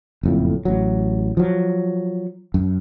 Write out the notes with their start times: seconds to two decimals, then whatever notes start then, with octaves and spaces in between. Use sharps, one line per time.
0.23 F#1 F2 A2
0.65 A1 F#3
1.37 F3 F#3
2.54 F#2